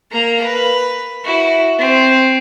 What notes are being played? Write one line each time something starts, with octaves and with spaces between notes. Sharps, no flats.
A#3 A#5
B4
E4 F#4
C4